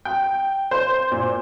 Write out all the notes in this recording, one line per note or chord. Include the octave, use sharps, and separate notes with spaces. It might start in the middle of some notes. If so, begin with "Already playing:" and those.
G5
C5
A#2